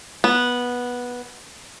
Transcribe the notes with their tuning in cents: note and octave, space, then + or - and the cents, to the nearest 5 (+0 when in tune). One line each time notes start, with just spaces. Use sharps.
B3 -10